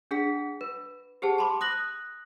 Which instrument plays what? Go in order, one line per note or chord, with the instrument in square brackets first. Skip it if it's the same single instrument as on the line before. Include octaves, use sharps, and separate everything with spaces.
[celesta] D4 G#4 F#5 B6
B4
G4 G#4 C5 F#5 A5
A5 B5 C6 D6
D#6 F#6 A#6 F#7